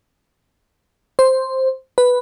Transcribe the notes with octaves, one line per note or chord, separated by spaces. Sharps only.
C5
B4